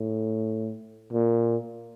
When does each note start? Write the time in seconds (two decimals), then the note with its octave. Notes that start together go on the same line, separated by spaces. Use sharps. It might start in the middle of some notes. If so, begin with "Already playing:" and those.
Already playing: A2
1.13 A#2